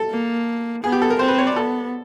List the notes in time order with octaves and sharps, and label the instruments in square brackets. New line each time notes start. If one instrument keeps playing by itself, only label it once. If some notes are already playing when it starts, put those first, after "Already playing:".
Already playing: [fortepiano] A4
[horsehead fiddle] A#3
[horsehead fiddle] B3 [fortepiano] G#4
[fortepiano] G4
A4
A#4
[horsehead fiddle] C4 [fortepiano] C5
[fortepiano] B4
C#5
D5
[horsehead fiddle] B3 [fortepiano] A4